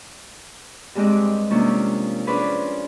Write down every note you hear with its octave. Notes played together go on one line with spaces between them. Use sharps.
G2 G#3 C4 G4 D#5 D6
C3 F3 A#3 C#4 D4 C#6
C#4 D4 G#4 B4 C5 D5